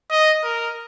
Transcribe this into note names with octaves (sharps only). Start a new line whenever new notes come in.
D#5
A#4